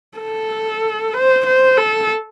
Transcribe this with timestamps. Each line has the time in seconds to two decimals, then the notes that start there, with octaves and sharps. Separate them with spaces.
0.18 A4
1.13 C5
1.46 C5
1.77 A4